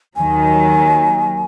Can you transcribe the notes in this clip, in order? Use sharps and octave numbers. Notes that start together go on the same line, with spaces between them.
D#2 D#3 F#3 G#5